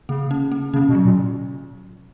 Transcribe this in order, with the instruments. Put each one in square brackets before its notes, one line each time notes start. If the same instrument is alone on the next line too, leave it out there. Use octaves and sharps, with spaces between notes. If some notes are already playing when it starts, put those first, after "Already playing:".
[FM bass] C#3 [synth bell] A#3
[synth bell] C#4
A#3
[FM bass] C#3 [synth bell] C#4
[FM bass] B2
[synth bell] F#3
[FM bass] A#2